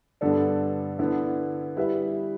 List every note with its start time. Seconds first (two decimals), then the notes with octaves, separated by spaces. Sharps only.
0.21 G2 D3 B3 D4 A4
0.99 D3 B3 E4
1.77 G3 E4 B4 E5